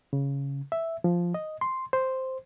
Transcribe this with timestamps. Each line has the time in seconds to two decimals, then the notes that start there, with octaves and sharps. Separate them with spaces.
0.13 C#3
0.72 E5
1.04 F3
1.34 D#5
1.61 C6
1.93 C5